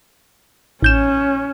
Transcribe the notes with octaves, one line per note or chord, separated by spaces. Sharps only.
A1 C#4 G6 E7